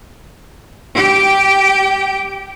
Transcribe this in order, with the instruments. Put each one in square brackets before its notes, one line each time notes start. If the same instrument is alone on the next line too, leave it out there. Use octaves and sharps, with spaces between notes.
[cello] G4 G5